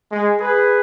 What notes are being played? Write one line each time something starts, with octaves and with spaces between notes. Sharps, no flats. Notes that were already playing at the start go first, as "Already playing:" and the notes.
G#3
G#4 B4